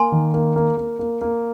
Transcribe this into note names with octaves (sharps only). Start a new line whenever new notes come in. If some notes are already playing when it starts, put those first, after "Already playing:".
Already playing: A#3 G#5 C6
D#3
A#3
A#3
A#3
A#3
A#3